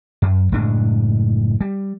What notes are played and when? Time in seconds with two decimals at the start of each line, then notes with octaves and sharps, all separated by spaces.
0.22 F#2
0.52 F#1 A2 G#3 D4
1.61 G3